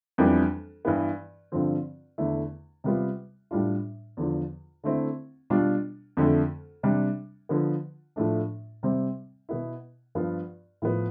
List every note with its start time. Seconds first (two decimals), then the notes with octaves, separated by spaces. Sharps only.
0.18 F2 E3 G3 B3 D4
0.85 G2 E3 B3
1.52 G2 D3 F3 C4
2.18 E2 D3 A3 E4
2.84 C3 G3 B3 F4
3.51 A2 G3 D4 F4
4.17 E2 D3 F3
4.84 D3 A3 C4 E4
5.50 B2 G3 D4 F4
6.17 F2 D3 A3
6.83 C3 G3 D4
7.49 D3 F3 B3
8.16 A2 F3 A3 D4
8.83 C3 G3 C4
9.49 B2 B3 E4
10.15 G2 F3 B3 F4
10.82 A2 F3 B3